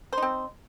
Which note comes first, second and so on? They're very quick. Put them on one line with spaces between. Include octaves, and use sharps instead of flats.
C5 D#4 C4